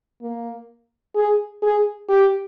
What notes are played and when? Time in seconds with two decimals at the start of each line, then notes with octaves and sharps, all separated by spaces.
0.22 A#3
1.15 G#4
1.63 G#4
2.09 G4